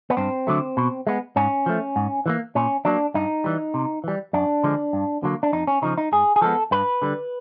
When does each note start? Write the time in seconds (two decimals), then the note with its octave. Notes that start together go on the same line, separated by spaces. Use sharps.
0.10 B3
0.17 G2 C4
0.47 D3 F#3 A3
0.77 B2
1.07 G#3 B3
1.36 G#2 C#4
1.66 F3 A3
1.96 G#2
2.26 E3 G3 A#3
2.55 A#2 C#4
2.85 F#3 A#3 D4
3.14 G2 D#4
3.44 E3 G3
3.74 C3
4.04 E3 G3
4.33 F#2 D4
4.64 D3 F3 G#3
4.93 G2
5.23 D3 F#3 A#3
5.43 D4
5.53 F2 D#4
5.67 C#4
5.82 C#3 F3 D#4
5.98 D#4
6.12 G#2 G#4
6.36 G#4
6.41 F3 G#3 B3 A4
6.71 G2 B4
7.02 D3 G3